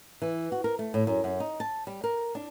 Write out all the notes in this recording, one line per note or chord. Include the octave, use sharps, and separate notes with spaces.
E3
F#4
A#4
A3
A2
F#2
F#2
D#4
A5
G3
A#4
D4